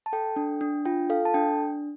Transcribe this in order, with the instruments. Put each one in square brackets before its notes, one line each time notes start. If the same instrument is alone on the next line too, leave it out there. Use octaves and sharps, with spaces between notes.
[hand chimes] A5
A4 G5
D4
D4
F4 G5
A4 F5
A5
D4 G5